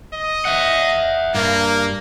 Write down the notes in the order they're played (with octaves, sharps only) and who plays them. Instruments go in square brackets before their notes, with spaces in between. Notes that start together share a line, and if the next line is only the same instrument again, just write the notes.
[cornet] D#5
[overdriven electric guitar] E5 F#5
[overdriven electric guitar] G2 [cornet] A#3